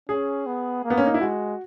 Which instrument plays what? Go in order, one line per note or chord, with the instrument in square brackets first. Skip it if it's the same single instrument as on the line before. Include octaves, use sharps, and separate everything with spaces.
[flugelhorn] C#4 [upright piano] G#4
[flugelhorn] B3
A#3
[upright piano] B3
C#4
D#4
E4
[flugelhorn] G#3 [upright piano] F#4